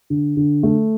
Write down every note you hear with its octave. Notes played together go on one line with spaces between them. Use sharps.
D3
D3
A3